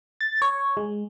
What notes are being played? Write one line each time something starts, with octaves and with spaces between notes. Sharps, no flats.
A6
C#5
G#3